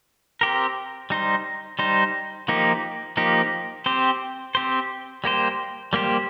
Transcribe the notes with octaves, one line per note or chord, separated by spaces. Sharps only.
C4 G4 A#4
G3 D#4 C5
G3 D#4 C5
F3 A#3 D#4 G4
F3 A#3 D#4 G4
C4 G4 C5
C4 G4 C5
G3 A#3 G4 C5
G3 A#3 G4 C5